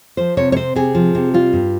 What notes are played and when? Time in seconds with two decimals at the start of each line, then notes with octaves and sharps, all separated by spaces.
0.17 F3 C5
0.37 C3 C#5
0.52 C#5
0.56 C4 C5
0.76 C3 G#4
0.95 F3
1.15 C3
1.34 G3 F4
1.53 G2